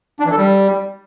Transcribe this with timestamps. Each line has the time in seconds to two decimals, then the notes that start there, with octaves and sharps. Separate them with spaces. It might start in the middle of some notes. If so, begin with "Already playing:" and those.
0.20 D4
0.25 E3
0.31 A4
0.37 G3